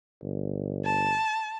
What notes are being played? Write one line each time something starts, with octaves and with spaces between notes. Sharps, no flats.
G1
A5